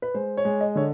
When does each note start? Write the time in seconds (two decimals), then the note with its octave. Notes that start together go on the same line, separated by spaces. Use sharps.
0.02 B4
0.14 G#3 C5
0.37 C#5
0.45 G#3
0.61 D#5
0.75 D3 C#5